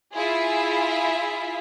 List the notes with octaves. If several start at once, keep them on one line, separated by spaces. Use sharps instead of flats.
E4 F4 G#4 E5